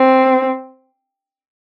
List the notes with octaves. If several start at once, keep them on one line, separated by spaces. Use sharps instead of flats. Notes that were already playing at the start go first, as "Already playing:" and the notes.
Already playing: C4